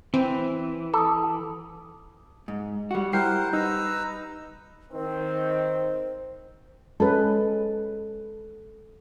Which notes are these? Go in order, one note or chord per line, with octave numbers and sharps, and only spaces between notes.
E3 C4
A4 D6 D#6
G#2
G3 F#4
G3 E4 A#4 C5 F#5 G5 C7
D#4 B4 A#5 E6
D#3 C4 C5
G#3 C#4 A4 B4